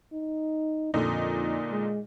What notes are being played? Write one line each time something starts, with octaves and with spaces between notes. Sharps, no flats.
D#4
F2 A#2 D3 D#4
G#3